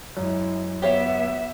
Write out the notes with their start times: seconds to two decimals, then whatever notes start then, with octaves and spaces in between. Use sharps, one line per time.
0.17 F#2 G#3 E4
0.82 B3 G4 C#5 E5 F5